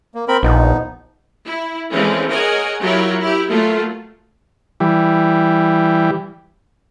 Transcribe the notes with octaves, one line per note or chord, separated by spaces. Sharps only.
A#3
C4 A#4 B5
A#1 F3 B3 D#4
E4
E3 F3 G#3 A3 C4 C#4
G#4 A#4 C#5 D#5 F#5 G#5
F#3 E4 F4 G4 A#4 C#5
E4 G4
F#3 A3 A#3 F4
E3 G3